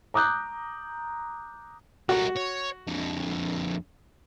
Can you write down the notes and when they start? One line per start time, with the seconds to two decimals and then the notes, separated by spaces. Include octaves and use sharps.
0.14 A#5 D6 D#6 F#6 G6
2.09 G3 F#4 A#4
2.36 C#5
2.87 F2 D3